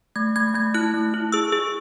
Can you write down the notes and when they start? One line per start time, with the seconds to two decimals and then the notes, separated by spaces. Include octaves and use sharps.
0.16 A3 G#6
0.36 A3 G#6
0.54 A3 G#6
0.74 E4 F#6
0.94 A3
1.14 E4
1.32 G#4 E6
1.52 G#4